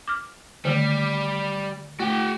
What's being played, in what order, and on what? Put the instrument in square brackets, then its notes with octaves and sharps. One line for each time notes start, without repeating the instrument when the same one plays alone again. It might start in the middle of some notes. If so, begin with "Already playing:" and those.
[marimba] D6 F6
[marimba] D3 D#3 A3 [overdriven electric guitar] G3
[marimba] A3 [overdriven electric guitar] F#4 G5